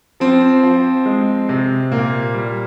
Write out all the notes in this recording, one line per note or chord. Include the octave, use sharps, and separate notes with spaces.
F3 C4
F3
G#3
C3
A#2 A#3
G3